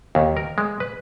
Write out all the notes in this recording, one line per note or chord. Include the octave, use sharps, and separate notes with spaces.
D#2
A#4
G#3
B4